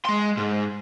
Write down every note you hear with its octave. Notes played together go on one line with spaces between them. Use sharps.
G#3 C6
G#2